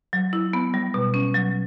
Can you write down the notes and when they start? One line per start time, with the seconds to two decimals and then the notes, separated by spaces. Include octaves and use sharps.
0.13 F#3
0.33 E4
0.53 B3
0.74 G3
0.94 B2
1.14 C#4
1.34 F#3